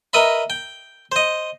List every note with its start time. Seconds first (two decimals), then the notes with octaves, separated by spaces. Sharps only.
0.13 A#4 B4 D#5 E5 B5
0.50 G5
1.12 C5 D#5